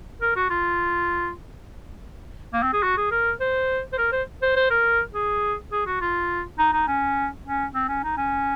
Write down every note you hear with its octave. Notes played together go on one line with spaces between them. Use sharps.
A#4
F#4
F4
A#3
C4
G#4
F#4
G#4
A#4
C5
C5
A#4
C5
C5
C5
A#4
G#4
G#4
F#4
F4
D#4
D#4
C#4
C#4
C4
C#4
D#4
C#4